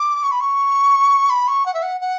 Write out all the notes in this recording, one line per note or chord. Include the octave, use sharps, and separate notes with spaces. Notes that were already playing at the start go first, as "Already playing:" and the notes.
Already playing: D6
C#6
B5
C#6
B5
C#6
F#5
E5
F#5
F#5